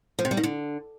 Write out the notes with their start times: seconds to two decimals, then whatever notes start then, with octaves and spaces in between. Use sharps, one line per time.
0.19 F3
0.25 C3
0.31 G3
0.37 D#3
0.43 D3